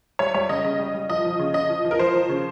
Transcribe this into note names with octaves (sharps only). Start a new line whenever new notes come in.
G3 C#5
G3 C#5
C#3 D#5
C#3 D#5
G3
G3
F3 D#5
F3
C#3
C#3 D#5
F3
F3
A#4
F3 C5
F3
C#3